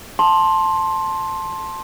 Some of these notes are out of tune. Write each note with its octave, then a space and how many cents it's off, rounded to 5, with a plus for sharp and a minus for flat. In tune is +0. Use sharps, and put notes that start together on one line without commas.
A5 +0 C6 +15